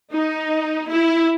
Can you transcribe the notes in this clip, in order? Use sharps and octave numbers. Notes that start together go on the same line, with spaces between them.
D#4
E4